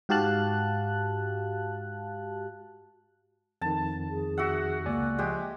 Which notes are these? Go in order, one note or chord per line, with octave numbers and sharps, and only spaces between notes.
G#2 F#4 G4 F5 A5 F#6
F2 D#3 A5
G#4
F#4 E5 F#5
C#2 A#3 D5 G#5
F3 G#3 G4